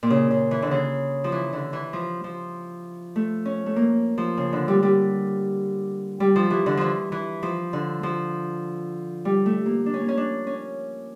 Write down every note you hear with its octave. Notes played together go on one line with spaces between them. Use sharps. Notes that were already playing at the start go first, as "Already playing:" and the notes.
A#2
C#3
C#3
E3
D3
C#3
F3
E3
D3
E3
F3
F3
A3
C#4
A3
A#3
F3
C#3
D3
G3
G3
G3
F3
E3
D3
E3 F3
E3
F3
D3
F3
G3
A3
A#3
D4
C#4
A#3
C#4
D4
C#4